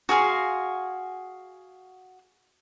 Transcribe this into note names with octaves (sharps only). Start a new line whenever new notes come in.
F#4 G#4 F5 C6